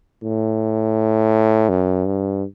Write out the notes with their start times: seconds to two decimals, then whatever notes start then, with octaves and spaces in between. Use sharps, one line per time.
0.23 A2
1.69 F#2
2.06 G2